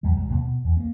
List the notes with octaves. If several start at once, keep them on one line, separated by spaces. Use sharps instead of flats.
E2 F3 G3
B1 F#3 G#3
D#2 C3 A#3
B2
E2
A#3 B3